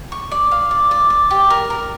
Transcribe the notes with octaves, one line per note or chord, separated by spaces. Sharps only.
C#6
D5
F5
D5
D5
D5
G4
A#4
A#4